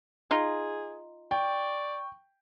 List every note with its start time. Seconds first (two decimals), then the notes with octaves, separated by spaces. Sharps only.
0.31 D#4 F4 G#4
1.31 D5 G5 C#6